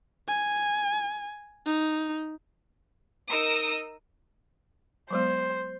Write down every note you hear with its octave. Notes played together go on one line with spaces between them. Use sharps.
G#5
D#4
D#4 A#4 D#6 E6
F#3 G#3 B3 C5